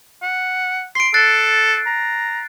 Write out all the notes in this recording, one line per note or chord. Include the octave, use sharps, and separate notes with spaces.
F#5
C6 C7 D7
A4 F#6 A6 C7
A#5